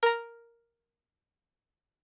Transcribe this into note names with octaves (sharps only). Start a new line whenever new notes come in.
A#4 A#5